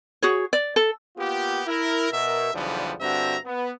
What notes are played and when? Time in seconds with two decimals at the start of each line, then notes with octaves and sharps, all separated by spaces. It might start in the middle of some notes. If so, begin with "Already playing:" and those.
0.22 F#4 G#4 C#5
0.53 D5
0.76 A4
1.17 A#3 B3 F4 G4
1.66 E4 A#4
2.11 B2 A#4 E5
2.54 B1 E2 D3 F3 G3 B3
3.00 G2 D3 C4 F#4 E5 A#5
3.45 B3